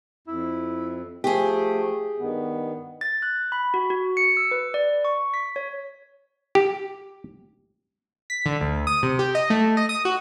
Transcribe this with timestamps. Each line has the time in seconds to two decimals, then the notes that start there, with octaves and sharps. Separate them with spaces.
0.28 F2 E4
1.24 F3 A3 G4 G#4
2.19 G2 D#3 B3
3.01 A6
3.22 F#6
3.52 B5
3.74 F#4
3.90 F#4
4.17 C#7
4.37 E6
4.51 B4
4.74 D5
5.05 C#6
5.34 B6
5.56 C#5
6.55 G4
8.30 B6
8.46 D3
8.61 D2
8.87 D#6
9.03 C3
9.19 G4
9.35 D#5
9.50 A3
9.77 D#5
9.89 D#6
10.05 F#4